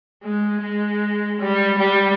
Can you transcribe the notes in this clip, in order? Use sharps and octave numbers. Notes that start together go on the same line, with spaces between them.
G#3
G#3
G3
G3